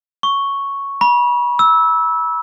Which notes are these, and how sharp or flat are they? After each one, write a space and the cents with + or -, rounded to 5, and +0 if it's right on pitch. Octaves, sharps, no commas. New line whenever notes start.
C#6 +0
B5 -35
E6 -15